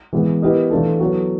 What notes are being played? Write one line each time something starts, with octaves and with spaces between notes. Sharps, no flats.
E3 G#3 B3
B3 E4 G4 A#4 D#5
E3 A3 D4 F4 A4
F#3 B3 E4 A4